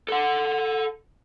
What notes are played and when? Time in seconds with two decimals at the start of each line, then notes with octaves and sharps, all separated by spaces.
0.08 A4 F#5